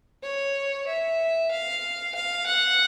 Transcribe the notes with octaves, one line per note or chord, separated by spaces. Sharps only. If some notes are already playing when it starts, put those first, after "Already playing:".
C#5
E5
F5
F5
F#5